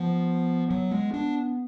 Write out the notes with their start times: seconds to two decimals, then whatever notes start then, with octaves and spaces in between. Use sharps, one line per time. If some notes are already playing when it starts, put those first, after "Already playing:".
Already playing: F3 B3
0.70 F#3
0.91 G#3
1.14 D4